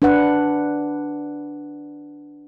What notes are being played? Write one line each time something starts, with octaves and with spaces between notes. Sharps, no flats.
D4 B4 F#5